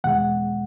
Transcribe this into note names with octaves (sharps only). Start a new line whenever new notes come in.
E2 B2 G#3 F#5